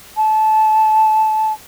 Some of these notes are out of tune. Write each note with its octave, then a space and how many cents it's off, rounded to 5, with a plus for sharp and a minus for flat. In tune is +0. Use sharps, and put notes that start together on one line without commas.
A5 -20